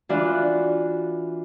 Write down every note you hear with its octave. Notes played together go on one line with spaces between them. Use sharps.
E3 D4 F4 F#4 B4